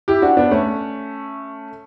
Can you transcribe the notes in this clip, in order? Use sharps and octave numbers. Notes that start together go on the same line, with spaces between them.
E4 G4
D4 F#4
B3 D4
A3 C#4